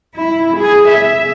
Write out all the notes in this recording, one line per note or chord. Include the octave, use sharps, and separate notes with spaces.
E4
G#4
E5